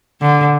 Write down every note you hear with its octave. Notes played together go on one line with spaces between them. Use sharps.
D3